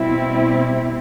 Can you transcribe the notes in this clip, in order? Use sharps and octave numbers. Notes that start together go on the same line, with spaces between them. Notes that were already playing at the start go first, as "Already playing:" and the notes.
Already playing: B2 G3 C4 E4